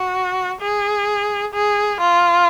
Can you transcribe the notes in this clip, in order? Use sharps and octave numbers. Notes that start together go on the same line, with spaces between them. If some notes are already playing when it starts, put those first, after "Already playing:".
Already playing: F#4
G#4
G#4
F4